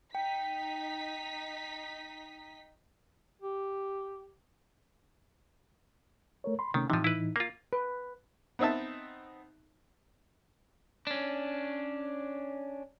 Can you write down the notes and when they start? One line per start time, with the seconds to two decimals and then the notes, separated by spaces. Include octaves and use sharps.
0.15 D#4 G5 B6
3.41 G4
6.44 A3 A#4 C#5
6.59 B5 C6
6.74 C3 D#3 A3 C#4
6.90 A2 C3 E3 F3 D#4
7.04 E4 B4
7.36 A#3 F4
7.73 B4
8.59 B3 C4 D#4 E5 A5
11.07 C#4 D4